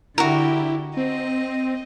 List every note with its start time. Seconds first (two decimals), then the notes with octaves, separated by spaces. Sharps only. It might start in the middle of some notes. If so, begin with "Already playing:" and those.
0.18 D3 E4 F#4 G4 A#4
0.97 C4 D#5